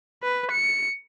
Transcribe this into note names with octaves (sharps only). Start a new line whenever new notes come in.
B4
C#7